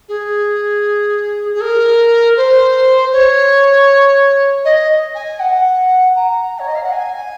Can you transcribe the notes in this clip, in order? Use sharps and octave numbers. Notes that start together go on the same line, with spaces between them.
G#4
G#4
A#4
C5
C#5
D#5
G#5
F#5
A#5
C#5
D#5
F5
F#5
G#5